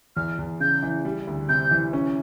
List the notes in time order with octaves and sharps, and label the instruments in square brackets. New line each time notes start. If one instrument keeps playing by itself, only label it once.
[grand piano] E2 [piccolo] F6
[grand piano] E2
[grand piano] C#3 [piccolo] G6
[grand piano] E3
G3
D2
[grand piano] C3 [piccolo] G6
[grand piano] E3
C#4